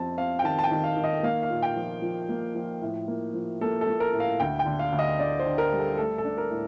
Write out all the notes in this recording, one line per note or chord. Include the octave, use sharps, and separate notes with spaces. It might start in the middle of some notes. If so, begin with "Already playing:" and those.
Already playing: F2 C4 A5
C4 F5
G5
D#3 A5
A5
G5
D#3
F5
D#3
D#5
A#3 F5
F5
A#2
G5
F3
F3
A#3
F3
A2
A#3
F3
A#3 A4
A4
A#3
A#4
A2
F5
D2 G5
G5
D3
F5
D2
D#5
D2 D5
C5
D3
A#4
G3
A4
A3 A4
A4
D4
A#4
A2